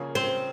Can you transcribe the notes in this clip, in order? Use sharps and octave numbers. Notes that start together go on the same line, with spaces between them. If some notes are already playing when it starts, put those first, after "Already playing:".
Already playing: C#3 F3 A#3 C#4 F4
C4